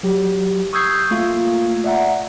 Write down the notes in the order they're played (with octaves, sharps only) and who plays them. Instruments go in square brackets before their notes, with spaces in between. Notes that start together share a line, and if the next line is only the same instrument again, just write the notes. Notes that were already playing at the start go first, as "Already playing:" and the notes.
[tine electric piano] F#3 G4
C#6 D#6 E6 G6 G#6 C7
A3 A#3 F4 F5
D5 E5 F#5 A#5